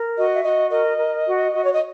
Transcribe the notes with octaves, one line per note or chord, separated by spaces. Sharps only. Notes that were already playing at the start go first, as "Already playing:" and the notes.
Already playing: A#4
F#4 D#5
E5
F#4 D#5
A#4 D#5
A#4
F#4
F#4
C#5
D#5